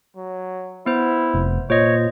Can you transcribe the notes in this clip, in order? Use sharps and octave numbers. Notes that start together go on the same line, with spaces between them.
F#3
B3 E4 C5
F1
A#2 C5 C#5 D#5